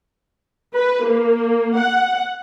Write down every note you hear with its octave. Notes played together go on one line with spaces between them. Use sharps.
B4
A#3
F#5